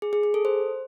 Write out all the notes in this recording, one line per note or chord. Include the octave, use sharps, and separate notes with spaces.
G#4
G#4
G#4
A4
C5